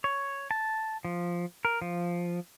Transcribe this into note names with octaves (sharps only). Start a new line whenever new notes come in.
C#5
A5
F3
A#4
F3